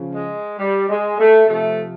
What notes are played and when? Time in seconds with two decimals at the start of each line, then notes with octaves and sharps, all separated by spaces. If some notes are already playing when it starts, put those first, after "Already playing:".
Already playing: C#3 F3
0.15 G#3
0.59 G3
0.89 G#3
1.19 A3
1.48 C3 F3 A3